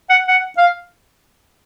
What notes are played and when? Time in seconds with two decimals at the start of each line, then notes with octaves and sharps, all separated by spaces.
0.10 F#5
0.28 F#5
0.57 F5